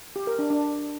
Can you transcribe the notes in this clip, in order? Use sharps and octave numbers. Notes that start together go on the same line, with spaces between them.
G4
A#4
D4
D4